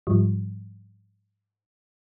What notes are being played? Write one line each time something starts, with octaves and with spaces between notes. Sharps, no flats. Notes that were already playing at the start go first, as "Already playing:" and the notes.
G#2 F3 G3